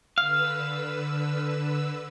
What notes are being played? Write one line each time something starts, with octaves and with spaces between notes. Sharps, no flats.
D3 B4 F5 E6